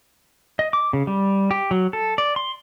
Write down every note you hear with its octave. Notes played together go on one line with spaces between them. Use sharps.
D#5
D6
C#3
G3
G4
F#3
A4
D5
C6